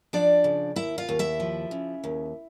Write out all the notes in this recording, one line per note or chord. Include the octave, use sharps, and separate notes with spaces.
F3 D4 D5
C#3
D#2 E4 E5
F4 F5
D#2
E4 E5
F3
C#3
D#2